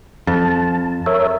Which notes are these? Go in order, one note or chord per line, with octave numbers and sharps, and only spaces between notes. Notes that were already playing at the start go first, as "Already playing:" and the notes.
F2 A5
A#4 C#5 E5